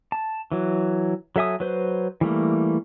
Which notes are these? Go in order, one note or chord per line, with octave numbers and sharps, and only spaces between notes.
A5
E3 F#3
F#3 A4 E5 G#5 D#6
F#3 B4 C5
E3 G3 A3 A#3